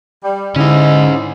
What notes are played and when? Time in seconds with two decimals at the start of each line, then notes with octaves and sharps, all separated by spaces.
0.24 G3
0.56 G#2 D3 C#4 E4 D#5